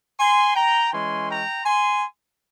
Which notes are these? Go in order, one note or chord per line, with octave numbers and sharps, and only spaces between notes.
G#5 C6
G5 A#5
E3 G#3 C#4 G#5 C6
G5 A#5
G#5 C6